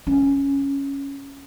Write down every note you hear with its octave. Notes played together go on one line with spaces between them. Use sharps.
C#4